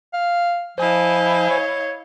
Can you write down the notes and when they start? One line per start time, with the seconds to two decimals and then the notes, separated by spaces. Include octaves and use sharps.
0.13 F5
0.78 F3 E4 C5 D#5 F5 G#5
1.50 C#5